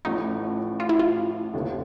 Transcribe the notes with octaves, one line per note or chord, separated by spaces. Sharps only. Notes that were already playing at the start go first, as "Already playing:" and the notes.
A1 A2 F3 D#4
F4
E4
F4
F1 D#2 D3